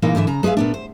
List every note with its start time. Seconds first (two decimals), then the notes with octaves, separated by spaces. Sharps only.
0.02 A#2 E3 G#3 A#3 D#4 F5
0.15 G#2 D3 E3 E5
0.27 C#3 A#5
0.43 G#3 G#4 B4 E5 F5
0.57 A#2 B3 D4
0.74 C5